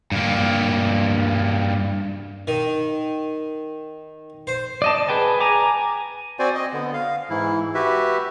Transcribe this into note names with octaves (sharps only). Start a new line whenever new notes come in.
G2 A#3
D#3
C5
D5 D#5 A5
G#4 B4 G5 A5
G#5 A#5 D6
C4 F#4 C5 D5 G#5
D#5
D3 B3
F5
G#2 E3 E4
F#4 G4 B4 E5